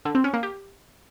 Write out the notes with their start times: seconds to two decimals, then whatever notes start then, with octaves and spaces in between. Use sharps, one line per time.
0.05 D3
0.15 C4
0.24 C#4
0.34 A#3
0.43 G4